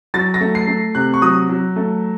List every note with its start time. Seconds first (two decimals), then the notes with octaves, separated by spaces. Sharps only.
0.14 F#3 A6
0.34 A#6
0.41 A3
0.55 C7
0.68 A3
0.95 C3 F#6
1.14 C#6
1.22 F#3 D#6
1.49 F#3
1.76 A3